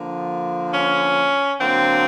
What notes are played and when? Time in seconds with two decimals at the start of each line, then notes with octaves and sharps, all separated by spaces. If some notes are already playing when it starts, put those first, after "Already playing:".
Already playing: D3 F3 A#3
0.72 C#4
1.60 D3 F#3 A#3 C4